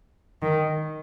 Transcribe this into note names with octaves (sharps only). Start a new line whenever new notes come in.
D#3